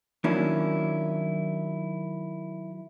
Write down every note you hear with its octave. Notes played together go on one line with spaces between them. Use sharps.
D#3 F#3 A#3 C#4 D4 E4